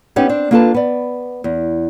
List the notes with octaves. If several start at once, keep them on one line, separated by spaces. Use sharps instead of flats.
B3 C#4 D#4 G4 C#5 F#5
C4 D4
A#3 D4 F4 A4 B4 A5
B3 D5
E2